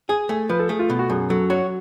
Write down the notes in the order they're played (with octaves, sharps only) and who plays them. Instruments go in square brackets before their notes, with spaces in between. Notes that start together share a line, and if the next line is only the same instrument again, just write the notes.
[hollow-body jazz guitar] G#4 [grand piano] G#5
[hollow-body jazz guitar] A3 [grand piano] G#5
[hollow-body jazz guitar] F3 [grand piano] B4
[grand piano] A4
[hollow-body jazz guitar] A3 [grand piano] G#4
[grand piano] F4
[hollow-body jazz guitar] B2
[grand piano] F#4
[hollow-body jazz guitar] F#2 [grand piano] G#4
[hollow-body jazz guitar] F#3 [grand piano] A4
[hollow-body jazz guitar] F#4 [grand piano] C#5